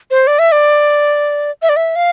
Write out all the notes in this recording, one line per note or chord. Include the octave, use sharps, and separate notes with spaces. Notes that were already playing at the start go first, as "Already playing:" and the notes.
C5
D5
E5
D5
E5
D5
E5
F5